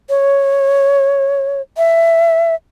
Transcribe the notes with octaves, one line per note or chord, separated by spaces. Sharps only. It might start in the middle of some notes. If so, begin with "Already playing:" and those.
C#5
E5